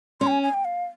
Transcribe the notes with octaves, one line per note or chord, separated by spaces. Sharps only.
C#4 C6
G5
G#5
G#5
G5
F5